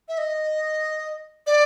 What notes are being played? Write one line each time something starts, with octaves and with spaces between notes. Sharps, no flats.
E5
D#5
D5